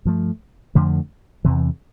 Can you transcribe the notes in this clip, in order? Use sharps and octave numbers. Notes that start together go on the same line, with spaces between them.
G2 F3 A3
F2 D3 F3 A3
E2 C3 E3